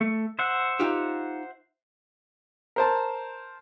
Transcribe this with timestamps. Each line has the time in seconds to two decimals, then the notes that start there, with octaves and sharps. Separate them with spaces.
0.01 A3
0.39 C5 E5 F#5
0.80 D#4 F4 G4
2.76 A#4 C5 A5